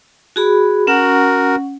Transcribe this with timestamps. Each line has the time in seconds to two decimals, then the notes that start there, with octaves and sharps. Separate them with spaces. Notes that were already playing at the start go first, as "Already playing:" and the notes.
0.36 F#4 G#4 B5
0.87 C#4 F#4 A#4 F#5